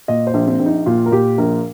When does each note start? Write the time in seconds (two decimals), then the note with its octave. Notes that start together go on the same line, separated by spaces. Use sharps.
0.08 A#2 D#5
0.27 C5
0.34 A#1
0.47 C4
0.60 A#1
0.66 D#4
0.86 A#2 F4
1.06 A#4
1.12 A#2 G4
1.38 A#1 A#4